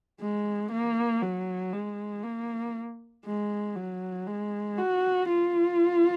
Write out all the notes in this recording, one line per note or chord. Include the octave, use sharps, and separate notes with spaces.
G#3
A#3
F#3
G#3
A#3
G#3
F#3
G#3
F#4
F4